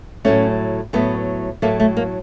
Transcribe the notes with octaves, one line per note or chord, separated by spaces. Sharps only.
A2 F#3 A3 C#4
A2 F#3 A3 B3
A2 F#3 A3 A#3
A3
A#3